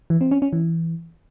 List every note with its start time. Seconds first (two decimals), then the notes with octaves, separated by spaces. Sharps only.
0.10 E3
0.21 C4
0.31 C#4
0.42 C#4
0.53 E3